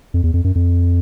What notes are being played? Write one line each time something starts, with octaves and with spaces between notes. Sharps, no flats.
F2
E2
F2
F#2
F2